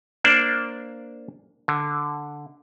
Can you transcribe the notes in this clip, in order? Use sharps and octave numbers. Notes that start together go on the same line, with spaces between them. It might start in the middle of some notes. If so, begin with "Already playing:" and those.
A#3 D4 C5 D5
D3